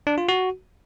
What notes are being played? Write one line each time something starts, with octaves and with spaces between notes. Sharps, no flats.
D4
F4
F#4